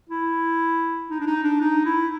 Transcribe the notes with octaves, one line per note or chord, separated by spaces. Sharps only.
E4
D#4
D4
D#4
D4
D#4
E4